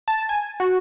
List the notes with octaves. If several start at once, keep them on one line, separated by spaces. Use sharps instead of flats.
A5
G#5
F#4